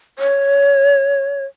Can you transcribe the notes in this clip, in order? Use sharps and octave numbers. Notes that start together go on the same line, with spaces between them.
C#5